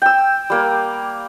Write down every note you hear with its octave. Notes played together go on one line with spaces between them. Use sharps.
G5 E6
G3 A#3